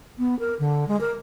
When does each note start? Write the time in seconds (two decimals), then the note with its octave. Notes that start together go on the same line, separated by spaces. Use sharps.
0.18 B3
0.39 A#4
0.59 D3
0.88 G#3
1.00 A#4